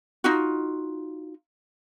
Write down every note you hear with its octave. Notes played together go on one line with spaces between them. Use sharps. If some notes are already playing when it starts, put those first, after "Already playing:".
D#4 F4 F#4